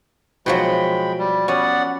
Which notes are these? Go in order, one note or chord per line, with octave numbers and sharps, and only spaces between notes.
B2 F3 F#3 G#3 G5 B5
G3
B3 C#4 D5 F#5